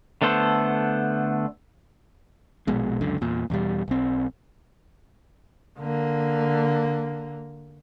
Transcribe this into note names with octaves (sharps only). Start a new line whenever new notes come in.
D3 A3 B3 A4 C5
A#1 B2 G#3
C#2 F#2 D3
E2 A#2
E2 B2 G3
B1 C4
D3 A#3